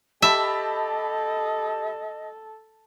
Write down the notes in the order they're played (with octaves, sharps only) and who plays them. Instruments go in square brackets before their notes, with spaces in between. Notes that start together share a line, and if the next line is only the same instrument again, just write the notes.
[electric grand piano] G4 A5 B5 [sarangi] A4 [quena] D#5 [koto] E5